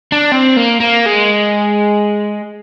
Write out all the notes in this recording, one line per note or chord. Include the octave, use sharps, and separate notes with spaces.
D4
C4
A#3
A#3
G#3